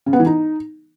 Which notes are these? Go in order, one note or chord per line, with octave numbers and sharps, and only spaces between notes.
C#3
B3
E3
D#4